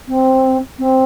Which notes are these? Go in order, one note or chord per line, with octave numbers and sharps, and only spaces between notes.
C4
C4